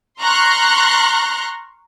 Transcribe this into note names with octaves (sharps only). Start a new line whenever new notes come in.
A#5 C6 C#6 F6 F#6